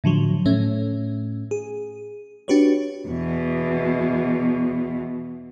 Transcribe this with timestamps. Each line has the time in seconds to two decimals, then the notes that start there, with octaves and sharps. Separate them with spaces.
0.04 A2 D3 F3 F#3
0.46 A2 A3 C#4
1.51 G#4
2.48 D4 F#4 G4 B4 C#5
3.08 E2 B2